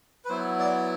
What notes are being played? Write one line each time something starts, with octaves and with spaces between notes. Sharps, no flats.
B4
F#3 B3 E4 C5
D5